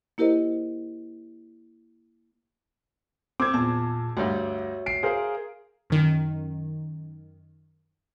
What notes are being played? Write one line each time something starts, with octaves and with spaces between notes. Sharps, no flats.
A#3 E4 G4 A#4 C5 D#5
C4 D6 E6 G#6
E2 A#2 A5
D2 G2 F#4 C#5 E5
C7 D7
G#4 A#4 C5 F5
F#2 D#3